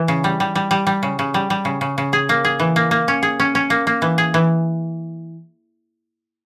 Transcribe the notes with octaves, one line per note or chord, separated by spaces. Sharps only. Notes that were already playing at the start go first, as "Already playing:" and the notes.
Already playing: E3
C#3
G3
G3
G3
G3
G3
C#3
C#3
G3
G3
C#3
C#3
C#3
G#4
A#3
G#4
E3
A#3
A#3
C#4
G#4
C#4
C#4
A#3
A#3
E3
G#4
E3